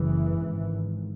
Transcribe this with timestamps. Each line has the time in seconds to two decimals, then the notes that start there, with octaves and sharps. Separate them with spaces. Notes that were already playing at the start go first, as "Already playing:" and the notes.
Already playing: F#1 F#2 C#3 E3
0.39 G#1 G#2